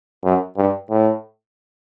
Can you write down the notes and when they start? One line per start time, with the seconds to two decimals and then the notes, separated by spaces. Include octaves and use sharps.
0.24 F#2
0.57 G2
0.90 A2